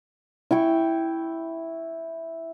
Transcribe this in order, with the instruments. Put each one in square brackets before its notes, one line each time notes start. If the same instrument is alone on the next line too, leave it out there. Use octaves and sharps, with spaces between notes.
[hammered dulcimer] E4 G5 C#6